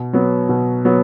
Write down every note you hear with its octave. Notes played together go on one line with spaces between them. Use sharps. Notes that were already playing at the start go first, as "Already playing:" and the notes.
Already playing: B2
F#3 B3
B2
F#3 B3